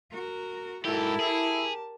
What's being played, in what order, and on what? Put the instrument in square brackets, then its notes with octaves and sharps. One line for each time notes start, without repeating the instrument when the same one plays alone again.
[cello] F#4 A#4
[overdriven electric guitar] G#2 G4 [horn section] E4 [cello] F#4 A4 [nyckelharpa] A#4 A5
[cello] G4 [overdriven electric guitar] G#4